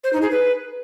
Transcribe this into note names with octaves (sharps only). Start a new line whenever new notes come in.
C5
D#4
G#4
B4